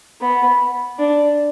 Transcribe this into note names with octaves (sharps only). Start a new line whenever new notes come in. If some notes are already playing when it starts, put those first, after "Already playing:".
B3
D4